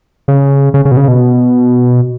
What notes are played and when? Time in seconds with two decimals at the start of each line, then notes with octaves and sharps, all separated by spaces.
0.28 C#3
0.74 C#3
0.85 C#3
0.91 B2
0.97 C#3
1.08 B2